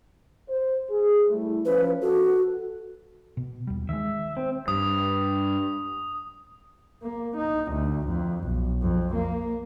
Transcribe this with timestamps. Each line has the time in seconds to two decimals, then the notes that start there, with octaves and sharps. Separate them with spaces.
0.49 C5
0.90 G#4
1.28 G3 A3 E4
1.65 F3 C#4 B4
2.02 F#4 A4
3.37 B2
3.67 D#2 G3
3.89 D#3 G#3 E5
4.37 C4
4.68 G2 D#6
7.03 A#3
7.37 D#4
7.72 D2
8.08 F2
8.44 B1
8.82 F2
9.15 A#3